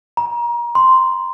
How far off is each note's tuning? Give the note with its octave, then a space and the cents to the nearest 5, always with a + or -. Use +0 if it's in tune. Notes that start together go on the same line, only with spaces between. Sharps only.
A#5 +30
C6 -5